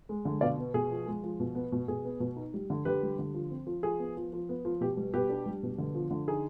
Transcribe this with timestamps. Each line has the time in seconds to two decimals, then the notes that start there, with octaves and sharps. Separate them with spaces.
0.09 G#3
0.25 D3
0.41 B2 D5 F5
0.58 B3
0.74 B2 G#4
0.91 F3
1.07 G#3
1.23 F3
1.40 B2
1.55 B3
1.72 B2
1.88 B2 G#4
2.05 B3
2.20 B2
2.36 D#4
2.54 G3
2.70 D3
2.85 D3 G4 B4
3.03 G3
3.19 D3
3.34 F3
3.51 C4
3.67 F3
3.83 F3 G#4
3.99 B3
4.17 F3
4.33 F3
4.49 B3
4.65 F3
4.81 B2 G4
4.97 G3
5.14 B2 G4 B4
5.29 D4
5.46 G3
5.63 B2
5.78 D3
5.95 F3
6.11 D3
6.28 D#4 G#4